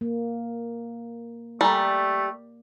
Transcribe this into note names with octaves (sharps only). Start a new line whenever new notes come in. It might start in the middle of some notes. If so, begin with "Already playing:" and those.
A#3
G3 A3 A4 G#5 A#5